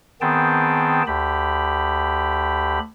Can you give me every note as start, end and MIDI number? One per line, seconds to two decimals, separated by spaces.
0.21 1.03 51
0.21 1.03 59
0.21 1.03 60
0.21 1.03 68
0.21 1.03 79
0.21 1.03 81
1.07 2.79 38
1.07 2.79 67
1.07 2.79 83